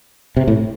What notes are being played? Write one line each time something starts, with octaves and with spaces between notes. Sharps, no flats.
C3
A2